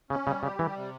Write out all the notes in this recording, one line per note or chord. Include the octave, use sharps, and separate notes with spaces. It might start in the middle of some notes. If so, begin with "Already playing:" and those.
C#3 C#4
C#3 G3
C#3 G4
E3 G3
C3